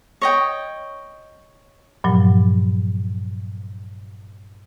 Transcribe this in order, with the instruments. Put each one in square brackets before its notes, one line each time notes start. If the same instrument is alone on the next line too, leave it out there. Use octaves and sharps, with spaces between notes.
[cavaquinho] C#5 D#5 G5
[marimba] G2 A#2 F3 F#3